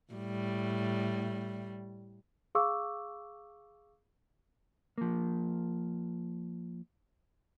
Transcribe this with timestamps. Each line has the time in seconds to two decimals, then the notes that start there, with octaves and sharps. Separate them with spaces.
0.13 A2 G3
2.55 G#4 F5 C#6 D6 E6
4.98 F3 A#3